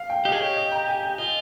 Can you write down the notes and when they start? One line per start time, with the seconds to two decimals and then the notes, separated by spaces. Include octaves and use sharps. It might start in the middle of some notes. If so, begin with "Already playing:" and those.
Already playing: F5
0.10 G5
0.25 G4 D#5
0.32 G#4
0.40 G4 C#5
0.56 D#5
0.72 A#5
0.88 G#5
1.03 G#5
1.18 F4 D#5